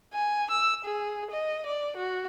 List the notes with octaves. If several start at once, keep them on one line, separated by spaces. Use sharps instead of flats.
G#5
E6
G#4
D#5
D5
F#4